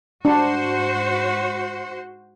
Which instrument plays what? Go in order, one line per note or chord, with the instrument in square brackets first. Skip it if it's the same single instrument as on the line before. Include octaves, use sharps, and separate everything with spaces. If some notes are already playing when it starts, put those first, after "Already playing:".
[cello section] G#2 F#4 C5 [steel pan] D4